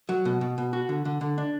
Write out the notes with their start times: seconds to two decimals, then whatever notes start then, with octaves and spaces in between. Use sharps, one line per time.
0.09 F#3
0.25 B2
0.41 B2
0.58 B2
0.73 F#4
0.89 D3
1.05 D3
1.21 D3
1.38 D4